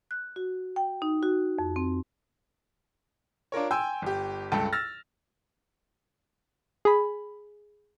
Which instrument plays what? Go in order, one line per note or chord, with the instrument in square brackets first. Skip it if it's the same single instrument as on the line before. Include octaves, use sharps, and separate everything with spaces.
[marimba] F#6
F#4
G5
D#4
F#4
F2
C4
[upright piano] D4 F4 A#4 C#5
G5 G#5 C6 E6 G6
G1 G4
C#2 G2 A4 G5 A5
E6 F6 A6 A#6
[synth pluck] G#4 B5